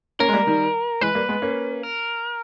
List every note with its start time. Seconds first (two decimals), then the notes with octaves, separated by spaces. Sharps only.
0.19 A#3 C#4 A#4
0.28 G#3
0.33 G3 A#3
0.47 D#3 G3
1.01 E3 G#3 B4
1.15 G3 A#3
1.28 G#3 B3
1.42 A#3 C#4
1.83 A#4